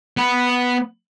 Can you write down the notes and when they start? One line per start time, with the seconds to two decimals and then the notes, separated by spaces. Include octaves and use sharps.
0.17 B3